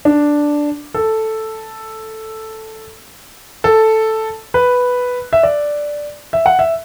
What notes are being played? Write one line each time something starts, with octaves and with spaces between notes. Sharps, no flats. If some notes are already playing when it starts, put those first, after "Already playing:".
D4
A4
A4
B4
E5
D5
E5
F#5
E5